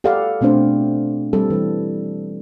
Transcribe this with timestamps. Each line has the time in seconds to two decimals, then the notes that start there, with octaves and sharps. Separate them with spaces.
0.04 G4 A4 D5 F5 F#5
0.41 B2 A3 C4 D4 C5
1.33 G3 C4 A4
1.50 E3 G3